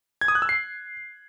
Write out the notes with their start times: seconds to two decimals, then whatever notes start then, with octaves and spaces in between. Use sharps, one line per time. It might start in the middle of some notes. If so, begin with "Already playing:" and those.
0.21 G#6
0.28 D#6
0.35 F#6
0.42 E6
0.49 C7